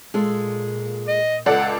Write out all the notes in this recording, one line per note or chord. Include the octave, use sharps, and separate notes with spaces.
A#2 G#3 F4 A4
D#5
C#2 A4 D5 F#5